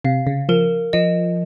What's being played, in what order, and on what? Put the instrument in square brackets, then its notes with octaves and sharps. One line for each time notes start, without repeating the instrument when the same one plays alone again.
[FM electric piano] C3 [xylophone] F5
[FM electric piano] C#3
[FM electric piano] F3 [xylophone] A#4
[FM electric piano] F3 [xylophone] D#5